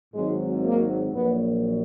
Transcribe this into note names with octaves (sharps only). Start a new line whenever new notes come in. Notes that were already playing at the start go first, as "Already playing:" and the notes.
G#1 G#2 F#3 G#3
A#3
A#1 A#2 F#3 B3